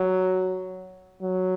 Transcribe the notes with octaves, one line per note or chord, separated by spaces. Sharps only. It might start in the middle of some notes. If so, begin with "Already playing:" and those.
Already playing: F#3
F#3